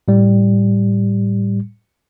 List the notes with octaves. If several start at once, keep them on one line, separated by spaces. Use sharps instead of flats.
A2 G3